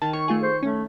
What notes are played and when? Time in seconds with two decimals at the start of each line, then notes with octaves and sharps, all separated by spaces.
0.02 D#3 A5
0.13 C#5 C#6
0.28 A3 F4 G#4
0.43 C5
0.63 A3 C#4